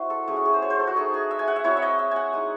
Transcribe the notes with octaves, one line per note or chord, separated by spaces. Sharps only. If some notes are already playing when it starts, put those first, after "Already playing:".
Already playing: E4 F#4 C5
A4
F#3 A3 C#4 G#4
F#4
G#4
C5
C#5
C5
A4
F#4
A3 D#4 G#4
G#4
E5
G#5
F#5
E5
F#3 C4 E4 C#5
E5
D#5
E5
F#5 G#5
G#3 D#4 G#5